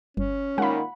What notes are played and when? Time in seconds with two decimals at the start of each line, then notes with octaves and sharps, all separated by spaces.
0.17 G1 C#4
0.58 A#2 D#3 G#3 F#5 B5